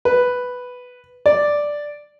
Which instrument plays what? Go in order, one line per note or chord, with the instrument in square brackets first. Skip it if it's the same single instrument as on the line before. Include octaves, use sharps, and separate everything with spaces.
[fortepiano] B4
D5